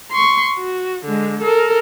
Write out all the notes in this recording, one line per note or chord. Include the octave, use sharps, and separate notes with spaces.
C6 C#6
F#4
D3 G#3
A4 A#4